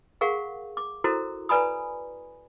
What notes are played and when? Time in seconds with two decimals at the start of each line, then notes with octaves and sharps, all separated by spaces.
0.21 G#4 A#4 F5 F#5 C#6
0.77 D6
1.04 E4 F#4 A4 A#4 C5 A#5
1.49 B4 D5 G#5 A#5 B5 D#6